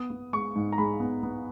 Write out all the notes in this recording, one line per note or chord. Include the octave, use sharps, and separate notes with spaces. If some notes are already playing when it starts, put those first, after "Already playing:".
Already playing: B3 D#6
B3
G#3 C#6
G#2
A#5
G#3 B5
B3
B3